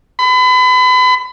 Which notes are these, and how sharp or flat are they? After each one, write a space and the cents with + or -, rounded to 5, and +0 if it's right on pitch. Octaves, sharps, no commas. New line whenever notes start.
B5 +35